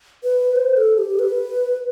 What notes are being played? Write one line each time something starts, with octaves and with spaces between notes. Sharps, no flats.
B4
C5
A4
G4
B4